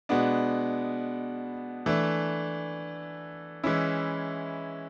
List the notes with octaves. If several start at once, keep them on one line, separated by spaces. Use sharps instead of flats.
B2 G#3 B3 D4
E3 A3 D4
E3 G#3 C#4 E4